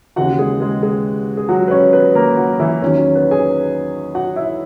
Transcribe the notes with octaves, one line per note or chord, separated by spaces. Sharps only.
D#2 C#3 E3 F#4 F#5
G#3 G#4
G#3 G#4
G#3 G#4
G#4
F#3 F#4
B4
C#4 C#5
B3 B4
A#3 A#4
F#3 F#4
E3 E4
E2 D#3 F#3 C#4
C#4
B3 B4
G#4 G#5
F#4 F#5
E4 E5